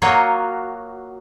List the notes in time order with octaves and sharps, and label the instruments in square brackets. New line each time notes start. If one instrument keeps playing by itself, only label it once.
[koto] F#3 A#3 F4 F#4 C#5 D#5